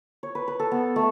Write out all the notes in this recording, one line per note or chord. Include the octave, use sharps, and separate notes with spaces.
C#5
B4
B4
A4
B3
A3